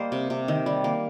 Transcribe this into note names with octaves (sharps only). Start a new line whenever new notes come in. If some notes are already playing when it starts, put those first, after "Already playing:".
Already playing: G3 A#3 C5 D#5
C3
C3
D#3
G3
A#3